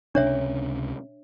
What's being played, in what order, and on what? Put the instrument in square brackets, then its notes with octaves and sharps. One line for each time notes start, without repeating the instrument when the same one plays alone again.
[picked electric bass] C#2 C3 C#4 [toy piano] D4 C#5 E5